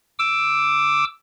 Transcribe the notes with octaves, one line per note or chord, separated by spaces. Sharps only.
D6 E6